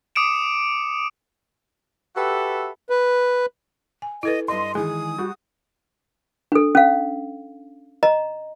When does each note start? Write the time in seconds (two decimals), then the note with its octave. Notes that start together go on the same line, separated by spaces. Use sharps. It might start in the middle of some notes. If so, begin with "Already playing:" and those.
0.15 D6 D#6 C#7 D7 E7
2.16 F#4 G4 A4 B4 E5
2.90 B4
4.02 G#5
4.23 E4 A4 B4 D#5
4.48 G2 D#5 C6
4.75 D#3 E3 G#3 G#4 G#5 D#6
5.18 G3 F#4
6.52 D4 A4
6.75 C#4 F5
8.03 D#5 A#5